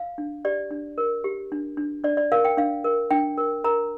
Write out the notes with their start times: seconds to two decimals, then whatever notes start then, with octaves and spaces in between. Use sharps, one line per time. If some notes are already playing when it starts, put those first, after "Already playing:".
Already playing: F5
0.18 D4
0.45 G4 D5
0.71 D4
0.98 A#4
1.24 G4
1.52 D4
1.77 D4
2.04 D4 D5
2.17 D5
2.32 A#4 F5
2.45 G5
2.57 D4 F5
2.84 A#4
3.11 D4 G5
3.38 A#4
3.64 A#4 A#5